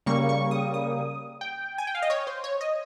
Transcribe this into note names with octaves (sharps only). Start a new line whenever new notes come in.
C#3 G3 A#3 C#6
C#6
D#6
D#6
G5
G#5
G5
F5
D#5
C#5
C5
C#5
D#5